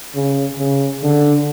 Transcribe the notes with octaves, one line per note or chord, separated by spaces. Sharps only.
C#3
C#3
D3